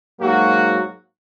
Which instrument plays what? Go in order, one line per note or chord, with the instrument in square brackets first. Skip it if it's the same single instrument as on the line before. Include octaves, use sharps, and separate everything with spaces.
[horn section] G#2 F#3 A#3 F#4